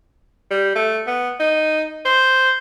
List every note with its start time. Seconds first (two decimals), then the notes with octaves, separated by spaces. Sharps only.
0.51 G3
0.76 A3
1.07 B3
1.40 D#4
2.05 C5